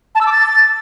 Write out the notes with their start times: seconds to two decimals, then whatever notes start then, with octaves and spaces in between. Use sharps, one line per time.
0.15 A5
0.21 E6
0.26 D6
0.32 A6